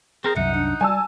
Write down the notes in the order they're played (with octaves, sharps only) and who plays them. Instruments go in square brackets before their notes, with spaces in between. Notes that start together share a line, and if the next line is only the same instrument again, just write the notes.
[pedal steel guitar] C4 A#4 C5 [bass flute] G#4
[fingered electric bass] C2 F#2 [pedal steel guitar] D#4 F#5 [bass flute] E5
[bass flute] D4
[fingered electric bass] G3 [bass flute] D5 [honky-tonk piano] G#5 A5 E6